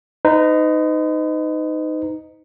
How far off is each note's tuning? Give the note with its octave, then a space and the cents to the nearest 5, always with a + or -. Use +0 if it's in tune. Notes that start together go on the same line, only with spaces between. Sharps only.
D#4 +0 B4 +45